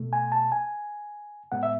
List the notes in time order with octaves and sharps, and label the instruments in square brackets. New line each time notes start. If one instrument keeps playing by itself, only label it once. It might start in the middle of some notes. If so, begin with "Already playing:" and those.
Already playing: [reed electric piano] B2 A3
G#5
A5
G#5
A2 G#3 B3 F#5
E5